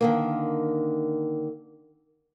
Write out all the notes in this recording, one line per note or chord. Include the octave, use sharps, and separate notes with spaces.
D3 D#3 A#3